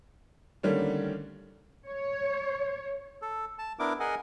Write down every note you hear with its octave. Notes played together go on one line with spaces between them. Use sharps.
D3 D#3 G3 A3 A#3 C#4
C#5
A4
A5
B3 D4 E4 A#4 D6
G#4 A#4 D#5 F#5 G#5